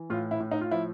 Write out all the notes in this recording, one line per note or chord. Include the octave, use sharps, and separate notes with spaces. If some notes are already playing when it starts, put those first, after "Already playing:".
Already playing: E3
A2 F4
E4
A2
D#4
F4
F3 E4